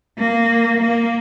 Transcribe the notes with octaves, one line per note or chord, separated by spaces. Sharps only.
A#3
A#3